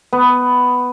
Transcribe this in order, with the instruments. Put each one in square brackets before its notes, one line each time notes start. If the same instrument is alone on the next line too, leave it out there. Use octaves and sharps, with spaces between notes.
[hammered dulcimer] B3